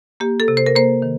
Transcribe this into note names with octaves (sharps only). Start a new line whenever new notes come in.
A#3 G4
A4
C3
C5
A#4
A#3 C5
D#3